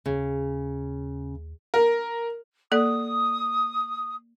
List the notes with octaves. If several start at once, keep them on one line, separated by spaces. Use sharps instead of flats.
D#2 C#3
A#4
A#3 A4 D5 D#6